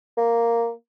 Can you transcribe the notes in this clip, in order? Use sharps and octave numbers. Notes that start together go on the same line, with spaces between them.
A#3